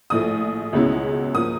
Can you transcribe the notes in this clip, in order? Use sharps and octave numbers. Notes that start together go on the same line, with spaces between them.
A#1 A2 F3 A3 D#6
C#2 B2 G#3 C#4 E4
F3 A#3 D#6